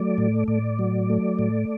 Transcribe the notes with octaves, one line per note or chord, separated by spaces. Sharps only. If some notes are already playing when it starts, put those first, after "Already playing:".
Already playing: F#3 A3 D5
A2
A2 D5
F#3
A3
A2